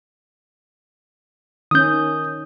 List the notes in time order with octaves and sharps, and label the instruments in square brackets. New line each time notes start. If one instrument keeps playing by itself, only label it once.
[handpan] D#3 C#4 [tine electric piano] D#6 G6